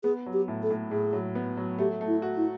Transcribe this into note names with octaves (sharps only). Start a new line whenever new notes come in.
B3 G#4
F#3
G4
A2
A4
A2
A2 G#4
F#3
B3
F#3
A3 G4
A3
E4
F#4
E4